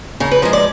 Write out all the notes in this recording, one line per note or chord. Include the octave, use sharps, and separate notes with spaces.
C#3 A#4
B4
F3 G#3 A#4
D5